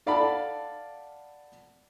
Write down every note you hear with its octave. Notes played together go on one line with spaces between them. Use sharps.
A4 D5 F5 F#5 A5 B5